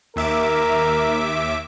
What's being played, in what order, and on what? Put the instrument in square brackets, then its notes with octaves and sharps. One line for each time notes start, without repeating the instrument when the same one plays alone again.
[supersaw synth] D#2 E5 D6 [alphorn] A#4